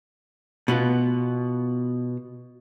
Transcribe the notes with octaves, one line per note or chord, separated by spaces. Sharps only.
B2 B3 F4